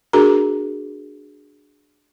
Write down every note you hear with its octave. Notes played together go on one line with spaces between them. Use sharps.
D4 F#4 G#4 A#4 A#5